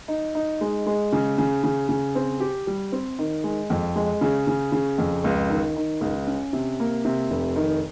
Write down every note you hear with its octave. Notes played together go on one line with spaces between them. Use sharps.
D#4
D#4
G#3
G#3
C#3
C#3
C#3
C#3
C4
G4
G3
C4
D#3
G#3
F2
G#3
C#3
C#3
C#3
F2
C#2
D#3
D#3
C#2
C#4
C3
A#3
C3
F1
D#3